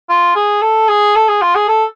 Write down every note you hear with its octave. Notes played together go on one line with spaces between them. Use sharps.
F4
G#4
A4
G#4
A4
G#4
F4
G#4
A4